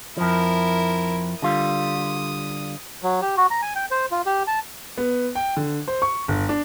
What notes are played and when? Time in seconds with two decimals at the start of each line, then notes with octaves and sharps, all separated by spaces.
0.17 F2 F3 E4 A#4
1.42 D3 G3 F4 D#6
3.03 F#3
3.22 G4
3.37 F#4
3.51 A#5
3.62 G#5
3.76 G5
3.91 C5
4.11 F4
4.26 G4
4.47 A5
4.98 B3
5.35 G5
5.57 D3
5.88 C5
6.02 C#6
6.28 G1
6.49 D4